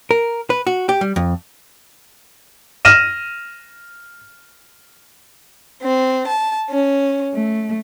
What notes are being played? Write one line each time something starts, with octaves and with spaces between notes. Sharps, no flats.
A#4
B4
F#4
G4
G3
F2
F6 A#6 D#7 E7
C4
A5
C#4
A3